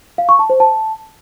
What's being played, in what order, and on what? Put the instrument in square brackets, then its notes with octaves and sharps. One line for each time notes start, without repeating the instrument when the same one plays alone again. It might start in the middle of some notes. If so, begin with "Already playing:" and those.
[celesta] F5
C#6
A5
C5
A5